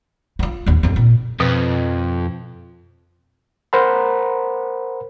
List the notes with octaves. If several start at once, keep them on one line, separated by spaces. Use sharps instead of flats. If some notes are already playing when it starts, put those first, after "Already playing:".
E4 F4
A1 D#2
A1 F2
A#2
F2 B2
A#4 C5 F#5 A#5 B5